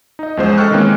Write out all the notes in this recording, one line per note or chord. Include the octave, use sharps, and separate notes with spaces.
D#4 D#5
E2 F3 G#3 C#4 C5
A4 D#5 G5 C#6 F6 F#6
D#3 E3 G#3 A#3 C4 C#4